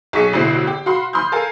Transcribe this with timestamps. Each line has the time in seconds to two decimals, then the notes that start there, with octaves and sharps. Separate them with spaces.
0.13 B1 G#4 C#6 B6 C#7
0.33 A1 B2 D3 E4 C5 C7
0.67 G4
0.86 F#4 F5 B5 C6
1.13 B5 C6 D#6 F6 G6
1.32 A4 A#4 F5 G#5